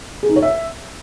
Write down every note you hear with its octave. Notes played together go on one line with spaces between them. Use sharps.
G#4
D#4
C#5
E5